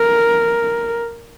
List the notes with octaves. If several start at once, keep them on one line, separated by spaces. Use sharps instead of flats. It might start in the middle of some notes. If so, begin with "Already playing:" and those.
Already playing: A#4